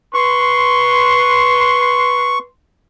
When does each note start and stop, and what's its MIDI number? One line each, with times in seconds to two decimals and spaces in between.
0.14 2.45 71
0.14 2.45 84
0.14 2.39 85